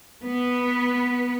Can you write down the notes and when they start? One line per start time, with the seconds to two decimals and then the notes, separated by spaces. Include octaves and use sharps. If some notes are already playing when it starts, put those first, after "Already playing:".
0.24 B3 B4